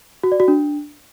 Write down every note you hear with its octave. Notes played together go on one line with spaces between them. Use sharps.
F#4
D5
F#4
D4